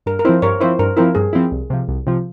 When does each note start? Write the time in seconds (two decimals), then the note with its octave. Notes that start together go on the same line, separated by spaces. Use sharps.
0.06 G2 A#4
0.19 A#4
0.25 F3 C4 E4 C5
0.42 G2 A#4 C#5
0.60 F3 C4 E4 C5
0.79 G2 A#4
0.97 F3 C4 E4 A#4
1.15 G2 G#4
1.33 F3 C4 E4
1.52 C2
1.70 C3 F3
1.88 C2
2.07 C3 F3